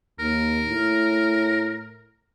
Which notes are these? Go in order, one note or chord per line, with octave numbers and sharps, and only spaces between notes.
D#2 A#4
A2